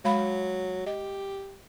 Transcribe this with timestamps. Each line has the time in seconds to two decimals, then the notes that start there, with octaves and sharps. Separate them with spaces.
0.05 F#3 G#3 F5 B5
0.86 G4 D#5